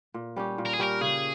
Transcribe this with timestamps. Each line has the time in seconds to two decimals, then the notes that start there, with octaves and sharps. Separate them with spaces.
0.14 A#2
0.36 G3 C#4 G4
0.58 A#2
0.66 A#4
0.73 G#4
0.79 G3 C#4 G4 A#4
1.01 C#3 G#4